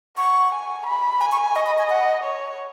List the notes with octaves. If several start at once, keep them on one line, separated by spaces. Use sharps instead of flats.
F#5 C#6
G#5
B5
G#5 B5
C#6
D#5 C#6
B5
G#5
F#5
C#5